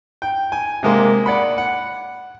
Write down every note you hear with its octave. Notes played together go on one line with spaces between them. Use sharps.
G5
G#5
C3 G#3 A#3
D5 F#5 B5
F#5